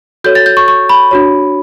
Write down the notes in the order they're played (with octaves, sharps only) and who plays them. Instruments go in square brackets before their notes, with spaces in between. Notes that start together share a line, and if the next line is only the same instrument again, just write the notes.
[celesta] F#4 A4 C#5 G6
A6
G6
C#6
C#6
B5
D4 F#4 C#5